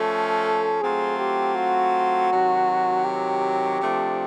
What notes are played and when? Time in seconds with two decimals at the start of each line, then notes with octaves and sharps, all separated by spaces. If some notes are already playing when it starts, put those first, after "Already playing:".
Already playing: F3 A3 C#4 A4
0.80 F#3 A3 C4 F4 G#4
1.18 G4
1.56 F#4
2.30 C3 D#3 F#3
3.05 G4
3.80 C3 F3 A3 D4